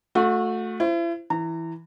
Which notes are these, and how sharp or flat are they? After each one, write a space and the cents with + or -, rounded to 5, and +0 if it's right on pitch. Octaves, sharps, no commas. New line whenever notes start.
A3 +0 F#4 -35
E4 +40 C5 +0
E3 +0 A#5 -30